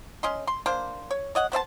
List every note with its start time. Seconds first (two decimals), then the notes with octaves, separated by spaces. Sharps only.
0.23 C#4 D#5 C6
0.47 C6
0.66 A#3 D4 C5
1.11 C#5
1.35 C#5 D#5 F#5
1.52 B3 C5 E5 A5